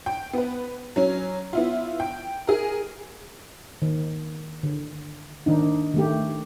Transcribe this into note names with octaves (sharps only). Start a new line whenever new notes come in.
G5
B3 B4
F#3 C#4
B3 E4 F4
G5
G#4 A#4
D#3
D3
D#3 D4 D#4
D#3 A3 G4